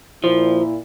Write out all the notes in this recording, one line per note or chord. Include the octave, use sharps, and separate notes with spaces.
A#2 F3 E4